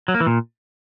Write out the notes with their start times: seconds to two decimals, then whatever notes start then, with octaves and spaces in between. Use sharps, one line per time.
0.08 F#3
0.14 A#3
0.20 E3
0.27 A#2